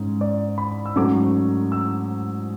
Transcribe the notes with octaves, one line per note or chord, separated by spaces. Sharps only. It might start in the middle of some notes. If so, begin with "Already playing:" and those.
Already playing: G#2 G#3 C#4
D5
B5
E6
G#2 F#3 A3 C#4 D6
E6